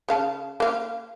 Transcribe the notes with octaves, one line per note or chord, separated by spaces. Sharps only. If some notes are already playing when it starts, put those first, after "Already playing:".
C#3 F5 A5
A#3 F5